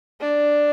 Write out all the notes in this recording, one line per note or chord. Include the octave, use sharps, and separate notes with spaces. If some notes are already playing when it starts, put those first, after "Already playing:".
D4